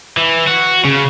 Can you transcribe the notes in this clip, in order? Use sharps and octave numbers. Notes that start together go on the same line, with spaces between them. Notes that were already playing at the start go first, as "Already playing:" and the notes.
E3
F#4
C#3